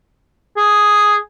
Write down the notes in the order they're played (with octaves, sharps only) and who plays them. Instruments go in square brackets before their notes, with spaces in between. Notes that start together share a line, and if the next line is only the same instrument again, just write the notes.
[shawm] G#4